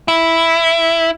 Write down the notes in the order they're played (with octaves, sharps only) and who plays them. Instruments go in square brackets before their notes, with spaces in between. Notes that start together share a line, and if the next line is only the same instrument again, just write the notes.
[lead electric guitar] E4